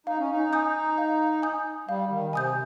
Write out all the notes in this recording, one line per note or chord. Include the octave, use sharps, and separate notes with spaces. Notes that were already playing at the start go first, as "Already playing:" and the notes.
D#4 F5
C#4
D#4
G#5 D#6 G6
F5
G#5 D#6 G6
G3 F5
D#3
C3 G#5 D#6 G6